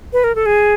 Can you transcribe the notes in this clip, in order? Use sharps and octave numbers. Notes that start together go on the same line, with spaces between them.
B4
A#4
A4
G#4